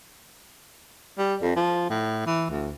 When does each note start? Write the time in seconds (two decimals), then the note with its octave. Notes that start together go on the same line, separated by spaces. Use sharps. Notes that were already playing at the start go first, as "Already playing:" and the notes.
1.18 G3
1.42 F2
1.56 F3
1.90 A2
2.26 E3
2.50 D2